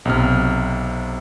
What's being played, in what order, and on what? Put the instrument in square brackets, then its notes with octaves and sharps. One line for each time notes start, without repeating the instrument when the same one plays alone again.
[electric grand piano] B1 C3 F6